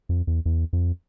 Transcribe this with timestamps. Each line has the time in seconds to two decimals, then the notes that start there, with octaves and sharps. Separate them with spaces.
0.09 F2
0.27 E2
0.45 E2
0.73 F2